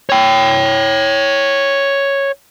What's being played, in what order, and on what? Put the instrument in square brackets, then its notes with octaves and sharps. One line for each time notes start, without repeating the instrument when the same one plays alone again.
[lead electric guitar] C#5 G5